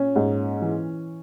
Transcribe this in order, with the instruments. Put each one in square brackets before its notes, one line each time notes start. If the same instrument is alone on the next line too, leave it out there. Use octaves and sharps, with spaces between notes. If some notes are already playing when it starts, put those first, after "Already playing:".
Already playing: [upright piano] A#2 C#4
G#2
E3